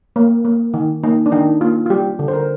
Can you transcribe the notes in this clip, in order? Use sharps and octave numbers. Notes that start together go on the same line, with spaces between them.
A#3
A#3
D#3
A#3 D#4
D4
D#3 D#4
A#3 F4
F4
G3 G4
D3
C5
A#4